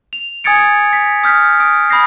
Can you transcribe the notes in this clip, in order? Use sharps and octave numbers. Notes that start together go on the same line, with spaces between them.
F7
G#5 D#6 G#6 A6 C#7 D7
B6
D#6 F6 G6 B6
D#6 D7
B5 D#6 G6 A#6 C7